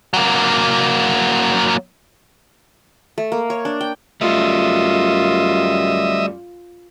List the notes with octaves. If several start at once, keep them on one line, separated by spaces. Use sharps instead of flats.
F#3 A#3
A3
A#3
C#5
D4
G5
F#2 G3 A3 F4 D#5 E5